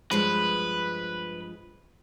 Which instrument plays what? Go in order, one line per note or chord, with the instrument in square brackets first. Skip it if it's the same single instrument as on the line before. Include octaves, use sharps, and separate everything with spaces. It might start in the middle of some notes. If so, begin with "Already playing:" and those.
[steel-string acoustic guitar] G2 F3 G#3 [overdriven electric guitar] B4